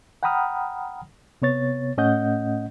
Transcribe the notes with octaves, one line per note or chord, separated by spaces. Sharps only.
F#5 G5 A#5 B5 D#6 F6
C3 B3 C#5 A6
A2 A3 C#4 D#5 F#5 G6